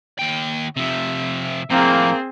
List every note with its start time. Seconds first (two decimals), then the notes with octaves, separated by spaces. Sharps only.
0.19 D#2 G5
0.77 C3 F3 E5
1.70 F2 A2 A#3 C4 G#4